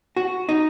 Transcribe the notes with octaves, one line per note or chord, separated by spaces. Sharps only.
F#4
D#4